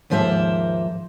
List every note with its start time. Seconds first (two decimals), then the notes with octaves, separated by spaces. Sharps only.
0.10 D#2 G#2 F3 A#3 C5 E5